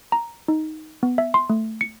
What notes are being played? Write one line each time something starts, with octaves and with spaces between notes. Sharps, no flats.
A#5
D#4
B3
E5
C6
A3
C#7